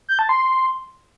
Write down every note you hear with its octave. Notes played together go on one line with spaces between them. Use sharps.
G6
A5
C6